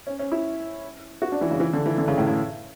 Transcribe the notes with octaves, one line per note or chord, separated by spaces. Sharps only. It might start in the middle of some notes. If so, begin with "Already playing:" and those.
C#4
C#4
E4
F#4
D4
E3
C#3
E3
D3
E3
D3
C#3
A2
C#3